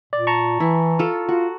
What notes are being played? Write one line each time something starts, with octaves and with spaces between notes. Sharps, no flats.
A#2 D5
A5 A#5 C#6
E3 E4
F4 A4
F4 F#4